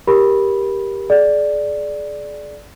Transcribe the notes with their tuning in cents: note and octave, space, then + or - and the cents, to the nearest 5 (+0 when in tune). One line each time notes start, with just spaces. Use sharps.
G4 +0 A#4 +15 B5 -10
G#4 +35 D5 +0